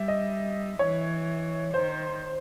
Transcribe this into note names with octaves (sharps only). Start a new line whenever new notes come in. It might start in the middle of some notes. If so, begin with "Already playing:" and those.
Already playing: G3 E5
D#5
E3 C#5
D#3 C5